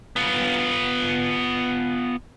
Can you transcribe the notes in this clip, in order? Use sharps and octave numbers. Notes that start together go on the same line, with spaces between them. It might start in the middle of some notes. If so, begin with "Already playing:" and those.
B3 F4